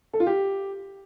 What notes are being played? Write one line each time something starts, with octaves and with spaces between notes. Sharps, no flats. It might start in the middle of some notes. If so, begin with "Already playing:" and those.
A4
F4
G4